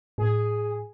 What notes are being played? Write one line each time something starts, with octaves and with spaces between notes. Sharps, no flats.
A2 G#4